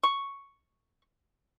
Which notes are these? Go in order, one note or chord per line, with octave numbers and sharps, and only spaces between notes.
C#6